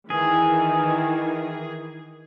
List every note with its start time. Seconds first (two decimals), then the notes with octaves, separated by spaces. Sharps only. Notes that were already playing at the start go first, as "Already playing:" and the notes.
0.10 D#3 E3 G#4